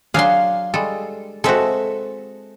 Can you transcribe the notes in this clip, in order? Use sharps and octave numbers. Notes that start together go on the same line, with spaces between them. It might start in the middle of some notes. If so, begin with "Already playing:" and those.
F#3 D4 G#4 F5 C6
G3 G#3 A4
G#3 C4 F#4 A4 E5